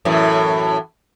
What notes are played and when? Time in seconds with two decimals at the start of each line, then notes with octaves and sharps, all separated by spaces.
0.05 F#2 A2 E3